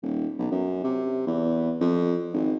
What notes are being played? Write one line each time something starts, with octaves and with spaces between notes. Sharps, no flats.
D#1
B1
F#2
C3
E2
F2
G#1